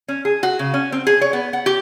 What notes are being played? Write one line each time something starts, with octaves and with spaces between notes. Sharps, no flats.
C#4
G#4
F#4
C#3
C#4
C4
G#4
C#5
B3
F#5
G4